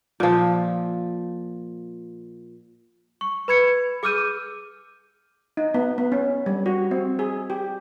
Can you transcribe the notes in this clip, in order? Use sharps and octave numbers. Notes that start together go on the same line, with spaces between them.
A#2 F3
C#6
B4 B5 G#6 C#7
G#4 D6 E6 F6 G6 D#7
D#4
B3
B3
C#4
G3
F#4
C4
G#4
G4